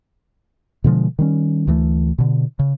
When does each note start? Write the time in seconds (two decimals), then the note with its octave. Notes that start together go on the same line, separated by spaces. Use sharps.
0.84 B2 D3 F3 G#3
1.19 D#3 G3 C#4
1.67 D2 E3 F3 A3
2.18 B2 D3
2.59 C#3